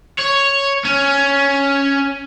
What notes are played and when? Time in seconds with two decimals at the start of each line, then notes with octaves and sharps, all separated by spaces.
0.19 C#5
0.85 C#4